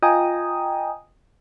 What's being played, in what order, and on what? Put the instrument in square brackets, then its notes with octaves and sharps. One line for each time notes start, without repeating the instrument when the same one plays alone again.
[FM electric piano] F4 D#5 G5 G#5 A#5 D#6